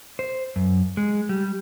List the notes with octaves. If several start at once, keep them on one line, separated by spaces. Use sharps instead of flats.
C5
F#2
G#3
G3